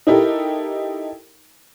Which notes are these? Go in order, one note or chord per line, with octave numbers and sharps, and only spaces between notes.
D#4 E4 G4 A4 A#4